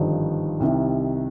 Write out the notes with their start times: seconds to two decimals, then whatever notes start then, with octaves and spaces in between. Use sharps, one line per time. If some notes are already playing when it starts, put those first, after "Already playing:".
Already playing: G#1 G2 D3 F3 D#4
0.60 C2 C3 D#3